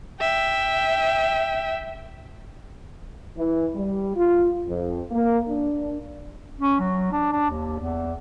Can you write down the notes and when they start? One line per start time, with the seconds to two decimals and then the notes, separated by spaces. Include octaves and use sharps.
0.20 E5 G5
3.37 E3
3.75 G3
4.17 F4
4.67 F2
5.11 A#3
5.49 D4
6.60 C#4
6.79 F#3
7.12 D4
7.32 D4
7.50 D#2
7.80 E2